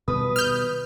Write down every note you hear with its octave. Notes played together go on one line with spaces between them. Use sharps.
B2 D#3 G3 B4 D#6
F6 G6